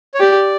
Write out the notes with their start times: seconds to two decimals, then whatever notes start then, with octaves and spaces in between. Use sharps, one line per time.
0.14 C#5
0.20 G4 D5